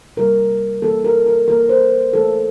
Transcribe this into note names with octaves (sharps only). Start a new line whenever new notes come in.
C3 G3 A#3 A#4
E3 A#3 A4
A#4
A#4
E3 A#3 A#4
C5
E3 A3 A4